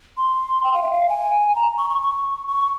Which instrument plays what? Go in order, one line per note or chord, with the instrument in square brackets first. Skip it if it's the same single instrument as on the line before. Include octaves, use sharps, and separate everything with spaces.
[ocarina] C6
G5
F5
E5
F5
G#5
G#5
A#5
C#6
C#6
C#6
C#6